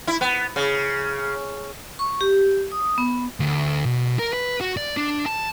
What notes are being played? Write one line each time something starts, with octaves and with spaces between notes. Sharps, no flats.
E4
B3
C#3
C#6
G4
D#6
B3
D2
B2
A#4
B4
F#4
D5
D4
A5